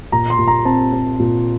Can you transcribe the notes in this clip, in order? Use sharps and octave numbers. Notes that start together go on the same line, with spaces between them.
A#2 A#5
C6
A#2
A#5
C4 A5
C4
A#2